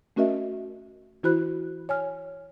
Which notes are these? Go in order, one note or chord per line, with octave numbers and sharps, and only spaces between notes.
A3 C#4 F#4 A#4 D#5 E5
E3 E4 F#4 C5 B5 F#6
C#5 G#5 F6